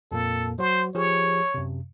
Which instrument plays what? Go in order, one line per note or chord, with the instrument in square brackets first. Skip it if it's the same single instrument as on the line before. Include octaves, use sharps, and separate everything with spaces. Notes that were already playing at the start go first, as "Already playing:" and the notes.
[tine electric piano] F2 A#2 A#3 [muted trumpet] A4
[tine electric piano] F#3 F#4 [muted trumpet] C5
[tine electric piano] F3 G4 G#4 [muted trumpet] C#5
[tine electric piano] F#2 C3